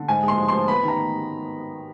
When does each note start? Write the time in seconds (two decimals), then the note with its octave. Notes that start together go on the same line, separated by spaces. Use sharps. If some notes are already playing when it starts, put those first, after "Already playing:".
Already playing: D3
0.08 G#2 G#5
0.23 G#3
0.28 C6
0.38 F3
0.48 F3 C6
0.67 B3 B5
0.83 D#3 A#5